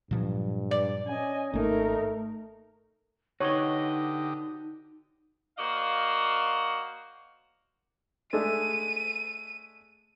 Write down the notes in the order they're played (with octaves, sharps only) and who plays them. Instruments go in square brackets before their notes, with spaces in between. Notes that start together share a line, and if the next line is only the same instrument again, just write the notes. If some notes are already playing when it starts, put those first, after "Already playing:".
[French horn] G2 [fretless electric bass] A#2 F3 F#3
[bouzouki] D5
[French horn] C#4 [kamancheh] D#5 G#5
[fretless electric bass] G#1 A#3 [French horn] A3 [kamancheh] D#4 A#4
[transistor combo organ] D3 G4 D#6 [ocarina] D#4 [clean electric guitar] F#4 B4 D#5 [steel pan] C#5
[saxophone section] A#3 F#4 C5 D5 D#5 F5
[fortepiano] G#3 A3 D4 [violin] D#7